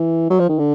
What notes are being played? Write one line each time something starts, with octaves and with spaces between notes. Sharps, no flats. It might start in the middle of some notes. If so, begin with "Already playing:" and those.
Already playing: E3
F#3
F3
D#3
D3